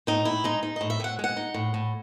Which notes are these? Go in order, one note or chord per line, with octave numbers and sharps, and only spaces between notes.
A2 D#4
A2 E4
G#3 D#4
D#4
A2 D#5
E5
A2 F#5
G#3
F#5
D#4
A2
A2